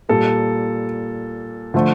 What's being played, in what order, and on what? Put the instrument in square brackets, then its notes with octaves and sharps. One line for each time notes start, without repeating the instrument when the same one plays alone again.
[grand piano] A#2 G3 A4
D3 F3 A3